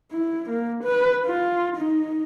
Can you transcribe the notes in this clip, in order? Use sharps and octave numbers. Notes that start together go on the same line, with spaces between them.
E4
A#3
B4
F4
D#4